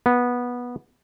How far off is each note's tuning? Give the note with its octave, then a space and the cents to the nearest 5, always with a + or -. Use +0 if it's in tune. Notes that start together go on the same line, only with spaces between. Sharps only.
B3 -15